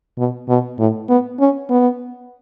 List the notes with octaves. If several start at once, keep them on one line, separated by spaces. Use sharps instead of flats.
B2
B2
A2
B3
C#4
B3